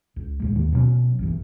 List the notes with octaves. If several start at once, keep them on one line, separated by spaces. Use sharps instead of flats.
C#2
E2 A2 G#3
D#2 D#3
B2 F#3 B3 C#4
B1 F#2 E3